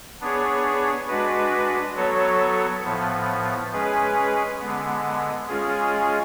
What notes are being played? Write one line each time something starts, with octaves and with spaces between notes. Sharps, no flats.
B3 D4 G#4 C#5
G#3 D4 F#4 B4
F#3 B3 F#4 A4 C#5
A2 F3 B3
G#3 C#4 G#4 B4
D3 G#3 B3
G#3 C#4 F4 G#4